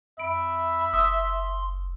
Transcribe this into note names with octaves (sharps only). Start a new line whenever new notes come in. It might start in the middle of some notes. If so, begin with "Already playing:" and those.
F2 E5 B5 D7
F#1 C6 D#6 E6